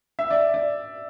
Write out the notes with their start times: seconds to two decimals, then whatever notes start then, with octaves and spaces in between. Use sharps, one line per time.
0.19 E5
0.30 D5
0.54 D5